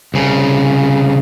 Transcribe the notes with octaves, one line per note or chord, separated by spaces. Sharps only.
C2 C#3